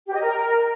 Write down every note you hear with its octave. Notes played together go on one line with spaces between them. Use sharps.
G4
D#5
A#4